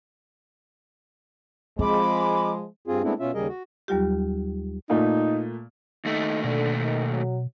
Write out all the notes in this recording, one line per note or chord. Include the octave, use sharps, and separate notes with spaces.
F3 G#3 C4 B5 D6
G2 C4 F4 G#4
G#3 A3 B3 C4 D4 E4
B2 C#4 F4 E5
D#2 C#3 G3 G#4 A#4 D#5
F#4
D#2 F#3 G3 F4 G4
A#2 A3 D#4
D#2 A3 D#4
B2 D3
D#3
F#3